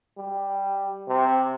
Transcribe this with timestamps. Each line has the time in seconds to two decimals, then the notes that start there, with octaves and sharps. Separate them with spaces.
0.17 G3
1.08 C3